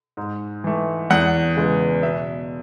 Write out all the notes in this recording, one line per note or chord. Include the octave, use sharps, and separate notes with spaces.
G#2
E3 A3
E2 F#5
C#3 G#3 B3
B2 E5